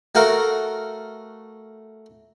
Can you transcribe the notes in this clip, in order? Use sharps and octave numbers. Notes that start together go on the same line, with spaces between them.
A3 F#4 A#4 F5